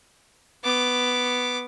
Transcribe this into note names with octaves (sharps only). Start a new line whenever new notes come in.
B3 D6